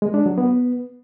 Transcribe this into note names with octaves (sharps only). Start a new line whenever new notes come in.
G#3
D4
F#3
B3